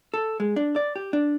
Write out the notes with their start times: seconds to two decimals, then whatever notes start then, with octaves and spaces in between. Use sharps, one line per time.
0.14 A4
0.40 G#3
0.56 D4
0.76 D5
0.96 G4
1.13 D4